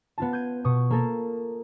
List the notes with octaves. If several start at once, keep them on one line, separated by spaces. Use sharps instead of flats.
B3 F4 A5
G6 G#6 D#7
B2 C#6 D#6
A#3 A4 A#4